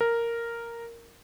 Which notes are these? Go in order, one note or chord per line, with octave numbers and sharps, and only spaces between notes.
A#4